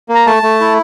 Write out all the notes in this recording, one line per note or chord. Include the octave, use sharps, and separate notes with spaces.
A#3
A#5
A3 A5
A3
E4